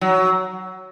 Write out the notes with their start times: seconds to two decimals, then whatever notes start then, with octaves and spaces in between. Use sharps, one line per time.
0.01 F#3